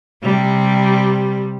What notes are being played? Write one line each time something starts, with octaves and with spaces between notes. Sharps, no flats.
C3 G3